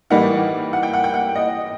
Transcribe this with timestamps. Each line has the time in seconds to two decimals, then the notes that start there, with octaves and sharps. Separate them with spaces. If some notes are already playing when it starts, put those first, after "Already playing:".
0.10 A2 E3 G3 A#3 D#4 F#5
0.73 F#5
0.83 G5
0.93 F#5
1.04 G5
1.14 F#5
1.35 D#5